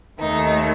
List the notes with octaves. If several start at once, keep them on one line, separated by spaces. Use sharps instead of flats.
D#2 D#3 A3 D#4